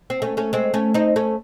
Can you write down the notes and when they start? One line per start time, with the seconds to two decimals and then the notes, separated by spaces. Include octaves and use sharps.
0.10 C4
0.22 A3 C#4
0.37 A3 C#4
0.53 G#3 C4
0.74 A3 C#4
0.94 C4 D#4
1.16 A3 C#4